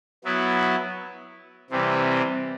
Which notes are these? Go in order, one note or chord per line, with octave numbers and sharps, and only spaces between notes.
F#3 B3 E4
C3 E3 G3 C4